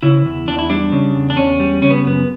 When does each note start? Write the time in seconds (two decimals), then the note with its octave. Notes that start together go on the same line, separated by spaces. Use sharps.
0.03 C#3 E4
0.25 E2
0.47 E2 D4
0.59 E4
0.70 G3 D4
0.92 C#3
1.15 E2
1.30 D4
1.37 E2 C#4
1.60 G3
1.82 C#3 C#4
1.90 B3
2.04 F#2 B3